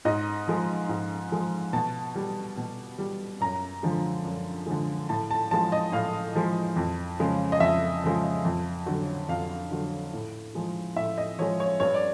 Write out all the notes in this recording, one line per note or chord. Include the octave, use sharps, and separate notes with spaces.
G#2 D#5
F3 G#3
G#2
F3 G#3
B2 A5
G3
B2
G3
F#2 A#5
D3 F3 G#3
F#2
D3 F3 G#3
A2 A5
A5
F3 G#3 A5
D#5
A2 F5
F3 G#3
F2
C#3 F3 G#3
D#5
F2 E5
C#3 F3 G#3
F2
D3 F#3
F2 F5
D3 F#3
A2
F3 G#3
A2 E5
D#5
F3 G#3 C#5
C#5
G2 C#5
D5